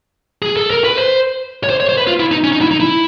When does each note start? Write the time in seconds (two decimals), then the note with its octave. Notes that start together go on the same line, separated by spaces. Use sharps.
0.42 G#4
0.57 A4
0.70 A#4
0.84 B4
0.96 C5
1.64 C#5
1.70 C5
1.80 C#5
1.89 C5
1.97 B4
2.07 F4
2.20 E4
2.31 D#4
2.44 C#4
2.52 D#4
2.61 E4
2.71 D#4
2.80 E4